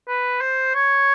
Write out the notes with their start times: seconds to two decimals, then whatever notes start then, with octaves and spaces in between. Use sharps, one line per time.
0.08 B4
0.41 C5
0.74 C#5